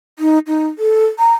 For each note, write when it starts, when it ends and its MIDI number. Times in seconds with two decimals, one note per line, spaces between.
0.19 0.38 63
0.47 0.67 63
0.78 1.05 69
1.19 1.33 82